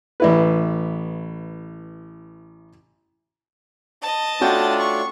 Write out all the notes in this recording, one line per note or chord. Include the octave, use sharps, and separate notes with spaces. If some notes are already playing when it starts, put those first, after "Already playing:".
A1 E4 B4
D#5 A5
A3 C#4 D4 F4 F#4 G5
C#6